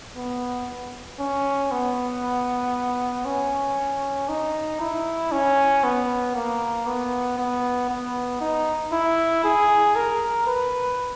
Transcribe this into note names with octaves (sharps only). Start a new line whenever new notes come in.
B3
C#4
B3
C#4
D#4
E4
C#4
B3
A#3
B3
B3
B3
D#4
E4
G#4
A#4
B4